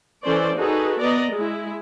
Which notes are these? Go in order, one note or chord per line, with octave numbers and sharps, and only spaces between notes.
E3 C#4 A4 C5 D5
D#4 F#4 G#4 A4 B4
B3 D5 D#5 A#5
G#3 E4